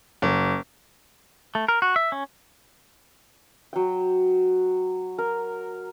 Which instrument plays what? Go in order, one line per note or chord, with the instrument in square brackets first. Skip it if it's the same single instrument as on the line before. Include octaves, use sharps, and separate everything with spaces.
[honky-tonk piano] F#1
[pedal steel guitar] A3
A#4
F#4
E5
C#4
[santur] F#3 G5
A#4